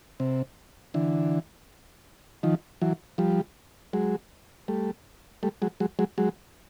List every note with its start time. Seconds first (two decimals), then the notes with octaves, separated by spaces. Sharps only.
0.20 C3
0.94 D3 E3
2.43 D#3 F3
2.82 E3 F#3
3.18 F3 G3
3.93 F#3 G#3
4.68 G3 A3
5.43 G3 A3
5.62 F#3 G#3
5.80 F#3 G#3
5.99 F#3 G#3
6.18 F#3 G#3